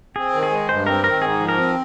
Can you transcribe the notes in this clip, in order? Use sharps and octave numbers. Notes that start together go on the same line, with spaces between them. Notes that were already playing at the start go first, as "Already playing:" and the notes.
C4 G#4
D#3
G#4
G#3
G2 C5
C4 A#4
D#3 A#4
G#2 G#4
F3
A#4
C4